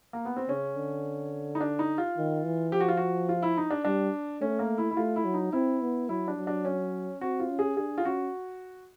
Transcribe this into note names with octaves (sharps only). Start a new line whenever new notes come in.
A#3
B3
C4
C#3 C#4
D3
D#4
D4
D#4
F4
D#3
E3
F3 G4
F#4
F4
F#4
F4
E4
D#4
D4
G3 D4
A3 C#4
A#3
E4
E4
A3 F4
E4
F#3
D#4
C4 E4
B3
F#3 E4
D4
F#3
D4
C#4
C4 F#4
F4
C#4
G#4
D4 G#4
F4
C#4 F#4